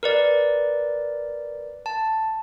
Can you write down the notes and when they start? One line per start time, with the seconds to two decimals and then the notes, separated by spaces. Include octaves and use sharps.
0.03 A#4 B4 D5
1.86 A5